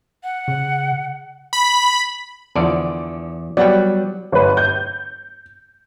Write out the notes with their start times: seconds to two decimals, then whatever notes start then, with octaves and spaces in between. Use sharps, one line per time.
0.24 F#5
0.48 C#3
1.53 B5
2.56 E2 D3 F3 D5
3.57 F#3 G3 B3 D5 F#5 G5
4.32 G1 B4
4.57 G6